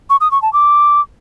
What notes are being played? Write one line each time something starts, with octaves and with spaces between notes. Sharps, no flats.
C#6
D#6
C#6
A5
D6